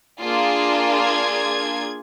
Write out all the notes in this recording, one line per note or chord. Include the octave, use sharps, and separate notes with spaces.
A#3 D4 F4 G#4
G#6